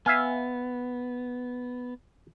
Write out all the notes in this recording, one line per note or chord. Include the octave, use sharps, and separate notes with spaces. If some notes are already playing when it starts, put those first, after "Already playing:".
B3 E5 F5 G#5